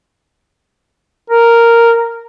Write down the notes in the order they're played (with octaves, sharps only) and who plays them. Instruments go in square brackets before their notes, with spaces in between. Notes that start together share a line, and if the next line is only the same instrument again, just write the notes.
[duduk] A#4